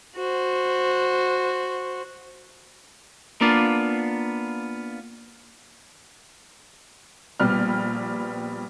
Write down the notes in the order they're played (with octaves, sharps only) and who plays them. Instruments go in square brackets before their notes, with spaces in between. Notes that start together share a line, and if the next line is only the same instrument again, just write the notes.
[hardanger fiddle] F#4 C5
[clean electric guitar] A#3 B3 D4 F4
[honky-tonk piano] A#1 G3 B3 F6